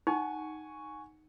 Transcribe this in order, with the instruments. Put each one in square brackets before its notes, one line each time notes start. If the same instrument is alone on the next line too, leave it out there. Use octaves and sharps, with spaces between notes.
[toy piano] D#4 [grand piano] F#5 G#5 C#6